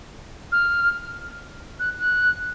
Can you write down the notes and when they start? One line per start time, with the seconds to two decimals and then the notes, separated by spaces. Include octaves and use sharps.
0.52 F6
1.79 F#6
1.99 F#6